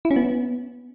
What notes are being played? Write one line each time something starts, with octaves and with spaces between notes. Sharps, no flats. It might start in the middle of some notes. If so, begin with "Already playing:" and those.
E4
C#4
B3